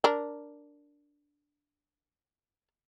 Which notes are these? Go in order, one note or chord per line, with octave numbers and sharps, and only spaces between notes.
D4 A#4